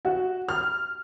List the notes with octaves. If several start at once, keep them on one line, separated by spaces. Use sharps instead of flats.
F#4
F6